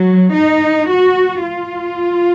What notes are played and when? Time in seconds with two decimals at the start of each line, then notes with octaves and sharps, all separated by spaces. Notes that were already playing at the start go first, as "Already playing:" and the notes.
Already playing: F#3
0.33 D#4
0.87 F#4
1.43 F4